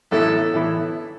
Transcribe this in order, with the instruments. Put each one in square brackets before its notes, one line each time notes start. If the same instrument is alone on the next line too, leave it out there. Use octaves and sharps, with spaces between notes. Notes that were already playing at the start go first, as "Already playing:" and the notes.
[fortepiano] A1 A2 E3 B3 E4 [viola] A4
[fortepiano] A2 E3 B3 E4